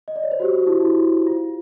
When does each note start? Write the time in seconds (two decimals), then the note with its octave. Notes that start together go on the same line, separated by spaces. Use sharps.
0.08 D#5
0.16 D5
0.24 C#5
0.31 C5
0.40 F#4
0.43 G4
0.56 F#4
0.67 E4
0.80 E4
1.27 F4